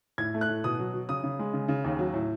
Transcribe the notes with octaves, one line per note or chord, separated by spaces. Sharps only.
A2 G#6
A3
F#6
A2
B2 D#6
F#3
F#3
C#3 D#6
C#3
G#3
C#3
C#3
D#2
F#3
A2